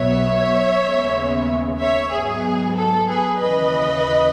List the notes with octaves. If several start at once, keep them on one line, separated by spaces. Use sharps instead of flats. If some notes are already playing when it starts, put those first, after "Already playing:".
Already playing: B1 B2 F#3 B3 C#5 E5
D#2 C#3 G#3 B3
C#5 E5
G#2 F#3 B3 G#4
A4
G#4 B4
D#2 C#3 E3 B4 D#5